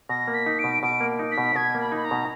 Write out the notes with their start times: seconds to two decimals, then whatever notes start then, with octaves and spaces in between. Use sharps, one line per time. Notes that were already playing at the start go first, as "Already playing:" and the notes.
0.09 B2 A#6
0.28 A#3
0.34 B6
0.46 D#4
0.59 D7
0.64 B2
0.83 B2 D7
1.01 A#3
1.19 D#4
1.31 B6
1.38 B2
1.56 B2 G#6
1.75 A#3
1.80 B5
1.92 D#4 B5
2.05 A#5
2.11 B2